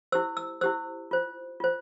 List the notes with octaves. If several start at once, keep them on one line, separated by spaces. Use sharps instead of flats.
E4 G4 C5 E6
E6
E4 G4 C5 E6
F4 C5
F4 C5